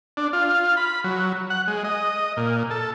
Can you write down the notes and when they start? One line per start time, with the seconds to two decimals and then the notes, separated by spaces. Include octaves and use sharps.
0.17 D4
0.33 F4
0.77 B5
1.04 F#3
1.50 F#5
1.68 G#3
1.84 D#5
2.37 A#2
2.71 A4